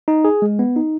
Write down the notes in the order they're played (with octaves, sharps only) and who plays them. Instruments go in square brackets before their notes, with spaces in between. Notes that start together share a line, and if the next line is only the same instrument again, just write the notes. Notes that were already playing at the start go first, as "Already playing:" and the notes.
[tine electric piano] D#4
G#4
G#3
B3
D#4